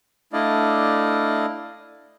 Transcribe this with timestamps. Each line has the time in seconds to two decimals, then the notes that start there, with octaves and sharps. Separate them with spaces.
0.33 A3 D4 E4 D5 D#5 F5